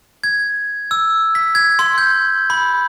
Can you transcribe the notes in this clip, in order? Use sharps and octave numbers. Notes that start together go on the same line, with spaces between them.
G#6
E6
B6
G#6
C6
G6
B5